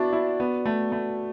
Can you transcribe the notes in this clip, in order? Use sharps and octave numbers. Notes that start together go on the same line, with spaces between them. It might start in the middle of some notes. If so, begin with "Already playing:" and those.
Already playing: B3 D4 E4 F#4 D5
E4
B3
A3
A3